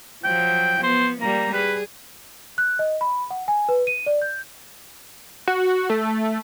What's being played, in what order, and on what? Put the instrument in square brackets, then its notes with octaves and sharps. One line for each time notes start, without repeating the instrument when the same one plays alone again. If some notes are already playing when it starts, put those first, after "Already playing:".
[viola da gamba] F3 F#3 [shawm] G5
[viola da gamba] B3 [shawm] C5
[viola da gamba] G3 A#3 [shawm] A#5
[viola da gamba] G#4 [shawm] B4
[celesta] F#6
D#5
B5
F#5
G#5
B4
D#7
D5
G6
[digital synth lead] F#4
A3